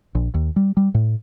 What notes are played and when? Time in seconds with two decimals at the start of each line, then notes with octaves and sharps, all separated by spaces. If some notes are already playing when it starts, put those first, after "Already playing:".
0.15 A#1
0.34 D#2
0.56 G3
0.77 G3
0.94 A2